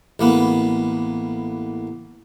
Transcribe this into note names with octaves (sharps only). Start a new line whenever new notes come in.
A1 A#3 B3